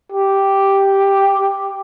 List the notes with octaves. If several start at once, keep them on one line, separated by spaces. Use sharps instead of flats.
G4